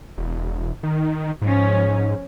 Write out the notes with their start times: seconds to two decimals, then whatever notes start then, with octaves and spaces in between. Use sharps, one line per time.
0.18 E1
0.83 D#3
1.42 G#2 F3 C#4